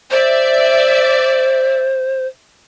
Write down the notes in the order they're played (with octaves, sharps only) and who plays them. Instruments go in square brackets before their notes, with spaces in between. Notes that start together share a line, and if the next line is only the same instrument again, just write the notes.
[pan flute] C5 [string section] D5 E5